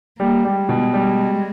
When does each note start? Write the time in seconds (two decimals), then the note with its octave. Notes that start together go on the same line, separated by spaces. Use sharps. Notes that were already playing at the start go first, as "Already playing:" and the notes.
0.20 G3 A#3
0.45 G3
0.57 G#3
0.69 B2
0.94 G3